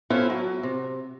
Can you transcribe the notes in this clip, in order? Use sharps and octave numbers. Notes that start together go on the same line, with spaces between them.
B3 C#4 E4 F4 A4 C5
F#3
C3